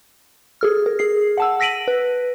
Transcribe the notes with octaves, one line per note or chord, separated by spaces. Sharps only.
G#4 A4 F6
A#4
G#4 C7
F#5 A5 E6
E6 A#6 B6 D7 D#7 F#7
B4